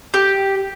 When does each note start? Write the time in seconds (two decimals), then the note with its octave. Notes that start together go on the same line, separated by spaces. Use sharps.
0.14 G4